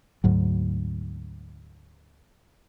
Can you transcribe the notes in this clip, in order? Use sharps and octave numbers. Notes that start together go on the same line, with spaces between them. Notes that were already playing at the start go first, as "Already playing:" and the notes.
D2 G#2 F#3